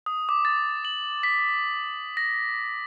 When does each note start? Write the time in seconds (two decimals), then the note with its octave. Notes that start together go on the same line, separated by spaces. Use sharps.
0.06 D#6
0.29 D6
0.45 A6
0.85 F#7
1.23 B6
2.17 A#6